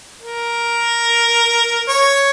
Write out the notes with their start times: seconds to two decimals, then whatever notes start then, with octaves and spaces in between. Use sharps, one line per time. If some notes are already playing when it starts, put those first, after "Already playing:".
0.23 A#4
1.89 C#5